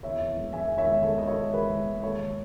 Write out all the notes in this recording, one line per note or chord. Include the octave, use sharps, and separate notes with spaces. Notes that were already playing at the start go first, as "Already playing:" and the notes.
E2 C#5 E5
E2
E1
E1 E5 G#5
E2
C#5 E5
G#3
G#3 A4 C#5
D#3 D#5
A4 C#5
E1
E2 G#4 B4
G#3
G#3
D#2 A4 C#5
D#2